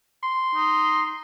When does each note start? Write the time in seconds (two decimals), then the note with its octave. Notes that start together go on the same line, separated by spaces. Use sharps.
0.23 C6
0.55 D#4